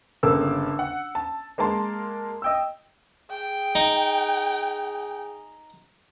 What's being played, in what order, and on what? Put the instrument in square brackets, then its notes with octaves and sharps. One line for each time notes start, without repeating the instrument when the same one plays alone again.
[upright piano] G1 C#3 A#3 A4 E6
F#5
A5
G#3 A#3 A#4 A5 C6
D#5 G5 E6
[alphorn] G#4 [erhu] G5
[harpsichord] D#4